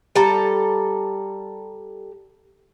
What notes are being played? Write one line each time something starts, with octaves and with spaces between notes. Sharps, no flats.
G3 A4 A#5